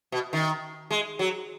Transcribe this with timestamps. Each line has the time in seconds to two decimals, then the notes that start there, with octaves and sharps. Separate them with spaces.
0.12 B2
0.33 D#3
0.91 G#3
1.19 F#3